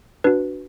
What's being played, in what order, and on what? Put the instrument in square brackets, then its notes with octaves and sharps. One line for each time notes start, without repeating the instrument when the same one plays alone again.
[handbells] D4 F#4 B4